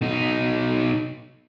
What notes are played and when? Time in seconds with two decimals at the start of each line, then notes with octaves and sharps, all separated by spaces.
0.01 B2 D#4